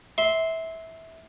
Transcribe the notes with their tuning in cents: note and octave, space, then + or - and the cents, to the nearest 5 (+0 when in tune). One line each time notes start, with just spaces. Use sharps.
E5 -20 C6 +0